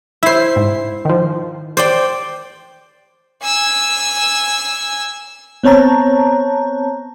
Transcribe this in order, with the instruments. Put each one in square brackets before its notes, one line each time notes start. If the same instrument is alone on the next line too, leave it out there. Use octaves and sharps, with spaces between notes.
[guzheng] E4 C5 [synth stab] E5 C7
[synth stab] G#2
D#3 F3
[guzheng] C5 D5 G5
[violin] G#5 E6
[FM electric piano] B3 C4 C#5 A5 A#5